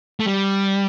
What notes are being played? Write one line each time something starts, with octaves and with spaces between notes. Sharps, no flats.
A3
G3